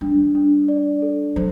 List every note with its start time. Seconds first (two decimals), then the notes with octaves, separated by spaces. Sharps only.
0.01 G3 D4
0.35 D4
0.68 D5
1.02 A4
1.36 F#3 C5